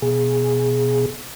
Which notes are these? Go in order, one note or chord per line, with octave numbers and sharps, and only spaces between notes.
B2 G#4